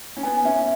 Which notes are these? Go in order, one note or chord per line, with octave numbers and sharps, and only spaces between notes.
C#4
B3 G#5
C#4 E5